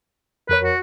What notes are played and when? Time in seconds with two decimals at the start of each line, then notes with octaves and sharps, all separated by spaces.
0.49 F2 A#4 B4 C#5
0.64 F#4